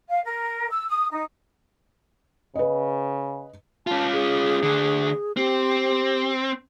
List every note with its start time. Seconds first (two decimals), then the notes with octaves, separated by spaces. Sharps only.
0.09 F5
0.23 A#4
0.70 E6
0.87 D#6
1.10 D#4
2.55 C#3 B4 D#5
3.87 C#4 F4 A5
4.12 G#4
4.63 D2 D3
5.37 C4 G4